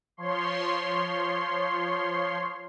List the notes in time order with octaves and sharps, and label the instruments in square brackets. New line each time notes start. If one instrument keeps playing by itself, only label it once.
[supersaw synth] F3 C#5 C6